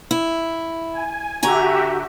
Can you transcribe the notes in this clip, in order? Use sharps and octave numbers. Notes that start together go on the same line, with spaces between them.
E4
G#5
D3 F#4 G4 E5 G#5 A#5